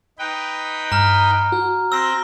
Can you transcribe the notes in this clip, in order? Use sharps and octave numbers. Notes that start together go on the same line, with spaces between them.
D#4 B4 G5
G2 A#5 F6
F#4
C4 E6 G6 A#6